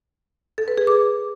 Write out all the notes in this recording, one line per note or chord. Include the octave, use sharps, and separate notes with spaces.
A4
B4
G#4
D6